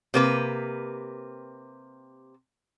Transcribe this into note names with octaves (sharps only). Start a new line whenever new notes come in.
C3 A#3 B4